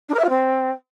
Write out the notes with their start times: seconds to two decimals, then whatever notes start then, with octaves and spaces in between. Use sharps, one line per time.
0.09 D4
0.14 A#4
0.19 E5
0.24 F4
0.29 C4